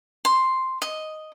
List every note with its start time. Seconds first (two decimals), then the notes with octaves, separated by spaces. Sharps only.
0.25 C6
0.82 D#5